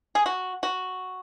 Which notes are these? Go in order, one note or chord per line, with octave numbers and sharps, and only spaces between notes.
G#4
F#4
F#4